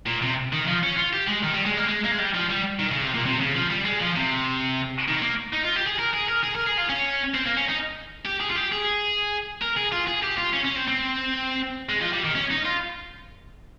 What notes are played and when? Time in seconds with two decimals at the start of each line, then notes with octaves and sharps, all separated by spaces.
0.07 A#2
0.22 C3
0.52 D#3
0.67 F3
0.83 C#4
0.97 F4
1.13 G4
1.28 G#3
1.44 D#3
1.54 G3
1.66 G#3
1.77 A#3
1.89 G#3
2.05 A#3
2.12 G#3
2.19 G3
2.34 F3
2.50 G3
2.79 D#3
2.91 C#3
3.02 C3
3.14 A#2
3.26 C3
3.41 C#3
3.56 F3
3.71 G3
3.86 G#3
4.01 F3
4.16 C3
5.08 D#3
5.22 A#3
5.53 D#4
5.64 F4
5.76 G4
5.86 G#4
5.99 A#4
6.14 G#4
6.28 A#4
6.43 G#4
6.55 A#4
6.67 G#4
6.78 F4
6.89 C#4
7.35 C4
7.46 A#3
7.57 C#4
7.69 D#4
8.26 G4
8.41 G#4
8.50 F4
8.56 G4
8.72 G#4
9.62 A#4
9.77 G#4
9.92 F4
10.08 G#4
10.23 G4
10.38 F4
10.53 C#4
10.65 C#4
10.76 C4
10.88 C4
11.89 G#3
12.01 F3
12.13 G3
12.24 D#3
12.35 C#4
12.51 D#4
12.65 F4